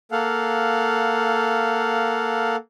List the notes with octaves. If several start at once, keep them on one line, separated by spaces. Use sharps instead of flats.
A#3 A4 F5 F#5